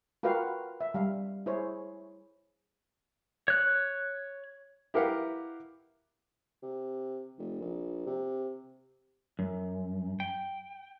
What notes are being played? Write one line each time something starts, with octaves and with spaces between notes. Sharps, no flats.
F4 F#4 A#4 B4 F5 G5
E5
G3 F5
E4 G#4 C5 C#5
C#5 F#6
E4 G4 A#4 B4 F5 F#5
C3
F1
A#1
C3
F#2
G5